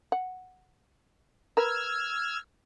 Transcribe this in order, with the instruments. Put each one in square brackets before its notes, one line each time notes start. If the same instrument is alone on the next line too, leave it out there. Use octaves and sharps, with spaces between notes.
[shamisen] F#5
[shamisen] A#4 B4 [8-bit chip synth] E6 F6 G#6